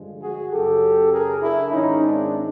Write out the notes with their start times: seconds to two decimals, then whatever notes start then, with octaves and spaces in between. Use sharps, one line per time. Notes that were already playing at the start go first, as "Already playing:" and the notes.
Already playing: G2 D3 F3 G#3
0.21 F#4 G#4
0.51 F#2 C#3 F#3 G4 A4
1.11 G#4 A#4
1.41 D4 E4
1.71 G#2 D#3 G#3 C#4 D#4
2.01 C4 D4